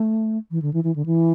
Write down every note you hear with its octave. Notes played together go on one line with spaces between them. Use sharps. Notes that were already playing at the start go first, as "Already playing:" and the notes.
Already playing: A3
E3
D3
E3
E3
D3
E3